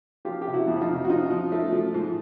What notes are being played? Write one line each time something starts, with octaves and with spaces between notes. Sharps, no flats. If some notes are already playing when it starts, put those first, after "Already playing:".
F3 F4 G4
G4
C3
E4 F#4
F2
D#4 F4
C3
F#4
F3 D#4 F4
F3
A3
F3
G#2